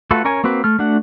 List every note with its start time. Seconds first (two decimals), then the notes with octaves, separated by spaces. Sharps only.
0.11 A3 F4 F#4 A4 B4
0.25 C#4 A#4 C#5 G#5
0.44 A#3 C4 F#4 B4
0.64 A3 F6
0.79 A3 D4 F#4 F#5